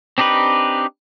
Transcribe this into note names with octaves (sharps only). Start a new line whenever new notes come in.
C4 D4 D#4 G4 B4